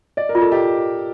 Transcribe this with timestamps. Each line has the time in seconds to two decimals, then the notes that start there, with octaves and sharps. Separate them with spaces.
0.17 D5 D#5
0.29 A#4
0.35 F4
0.41 A4
0.52 G4 D#5